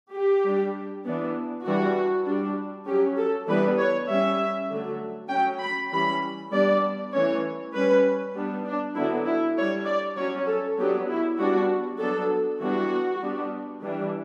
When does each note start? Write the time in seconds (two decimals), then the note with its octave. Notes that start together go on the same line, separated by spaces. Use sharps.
0.13 G4
0.43 G3 D4
1.05 E3 B3 D4
1.65 E3 G3 D4 F#4
2.26 G3 D4
2.86 C#4 G4
2.91 F#3
3.18 A4
3.47 E3 G3 B3 D4 B4
3.78 C#5
4.08 G3 C#4 E5
4.70 D3 F#3 A3
5.30 F#3 C#4 G5
5.61 B5
5.91 E3 G3 C#4 B5
6.51 G3 B3 D4 D5
7.13 E3 A3 C#4 C#5
7.73 G3 C#4 B4
8.34 G3 B3 D4
8.65 D4
8.96 D3 F#3 B3 D4 E4
9.26 E4
9.56 G3 D4 C#5
9.86 D5
10.17 F#3 C#4 C#5
10.47 A4
10.78 F#3 B3 D4 G4
11.08 E4
11.38 G3 B3 D4 F#4
11.99 F#3 B3 D4 A4
12.60 E3 G3 B3 D4 F#4
13.21 G3 B3 D4
13.82 E3 G3 D4